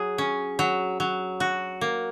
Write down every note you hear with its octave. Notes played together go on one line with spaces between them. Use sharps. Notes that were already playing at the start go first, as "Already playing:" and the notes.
Already playing: F#3 G#4
C#4
F#3
F#3
F#4
A#3